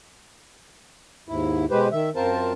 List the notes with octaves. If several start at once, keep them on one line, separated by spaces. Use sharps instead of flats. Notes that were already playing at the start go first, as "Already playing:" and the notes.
D#2 G#2 E4
B2 G#3 G4 B4 C5
D#3 E5
F#2 C4 F4 A#4 C5 A5